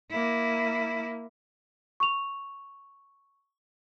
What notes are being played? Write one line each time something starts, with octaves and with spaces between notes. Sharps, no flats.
A#3 E4
C#6 F7